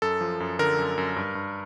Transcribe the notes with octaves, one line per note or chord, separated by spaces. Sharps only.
F#2 A4
F3
F#2
D3 A#4
F#2
F#2
G2
G2